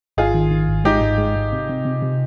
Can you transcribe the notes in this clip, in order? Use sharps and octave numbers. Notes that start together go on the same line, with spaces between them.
G#1 F4 G#4
D#3
D#3
G#1
G#3 D#4 G4
G#2
G#3
G#2
C3
C3
C3
C3